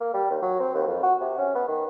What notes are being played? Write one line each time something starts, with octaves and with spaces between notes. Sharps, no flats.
A#3
G3
D#2
F#3
C4
D#2
F2
F#4
C3
C#4
B3
D#3